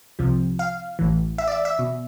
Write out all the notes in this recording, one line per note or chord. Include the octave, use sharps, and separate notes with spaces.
C2 C3 F3
F5
A1 A2 E3
E5
D5
E5
E5
B2